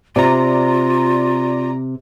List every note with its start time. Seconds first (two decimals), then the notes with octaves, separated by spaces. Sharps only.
0.16 C3 F4 D5 A#5